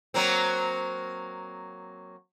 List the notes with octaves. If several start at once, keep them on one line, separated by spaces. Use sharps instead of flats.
F#3 A#3 C4